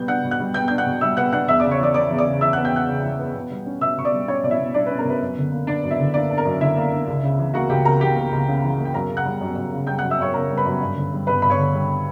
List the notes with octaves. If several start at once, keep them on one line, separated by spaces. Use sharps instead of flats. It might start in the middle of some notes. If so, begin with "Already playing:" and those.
Already playing: B2 G3 B3 G6
D4 F#5 F#6
B2
F#5 F#6
G3
B3 G5 G6
D4 G6
F#5 F#6
B2
G3 E5 E6
B3 F#5 F#6
D4 F#5 F#6
E2 E5 E6
D5 D6
C#3
C#5 C#6
E3 D5 D6
B3 D5 D6
E2
D5 D6
C#3
E3 E5 E6
F#5 F#6
B3
G5 G6
E2 F#5 F#6
C#3
E3
B3
B2
G3
C#4
B2 E5 E6
B2 C#6
D5 D6
G3
C#4 C#5 C#6
B2 D5
E4 E5
B2
G3 D4 D5
B4
C#4
A#4
B2 B4
F#2
D3
A#3
D4 D5
F#2
E4 E5
D3
A#3 D4 D5
D4
A#4
F#2
D3 E4 E5
A#3
D4
C#2
C#3
E3
A#3 F#4 F#5
C#2 G4 G5
C#3 A#4 A#5
E3 G4 G5
A#3
C#2
C#3
E3
A#3
G5
F#2 A#4 A#5
C#3
F#5 F#6
G3
F#2
F#2
C#3
G3 G5 G6
F#5 F#6
F#2
E5 E6
F#2 C#5 C#6
C#3 A#4 A#5
G3
B4 B5
F#2
G2
D3
G3
G2 B4 B5
G2 B5
C#5 C#6
D3
G3